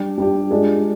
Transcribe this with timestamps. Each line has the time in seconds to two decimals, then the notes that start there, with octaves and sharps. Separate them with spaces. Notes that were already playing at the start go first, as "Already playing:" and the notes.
Already playing: G3 D4 G4
0.18 G3 D4 G4
0.51 G#3 D4 F4 G#4